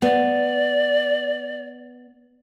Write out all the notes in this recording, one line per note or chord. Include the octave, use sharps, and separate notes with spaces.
B3 D5